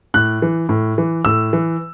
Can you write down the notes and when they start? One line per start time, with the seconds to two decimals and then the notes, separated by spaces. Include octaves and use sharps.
0.14 A2 F#6
0.42 E3
0.69 A2
0.98 E3
1.25 A2 E6
1.53 E3